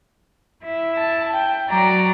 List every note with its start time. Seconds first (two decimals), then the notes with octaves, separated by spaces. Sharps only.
0.64 E4
0.98 A5
1.33 G5
1.69 F#3 D5 A#5